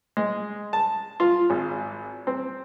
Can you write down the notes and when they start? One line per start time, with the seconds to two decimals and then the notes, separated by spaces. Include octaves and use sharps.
0.17 G#3
0.73 A5
1.20 F4
1.50 G#1
2.27 C4